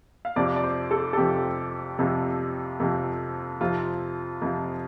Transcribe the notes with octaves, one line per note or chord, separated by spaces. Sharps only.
F5
F2 C3 F3 D5
D5
C5
A4
A4
F2 C3 F3 G4
F2 C3 F3
F2 C3 F3
F2 C3 F3 F4
F2 C3 F3